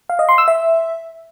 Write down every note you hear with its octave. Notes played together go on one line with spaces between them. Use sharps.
F5
D#5
C6
E6
E5